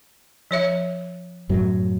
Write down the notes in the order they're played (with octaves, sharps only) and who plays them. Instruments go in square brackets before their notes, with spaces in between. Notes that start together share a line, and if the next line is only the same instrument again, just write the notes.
[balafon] F3 C#5 E5
[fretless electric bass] F#2 A2 F#3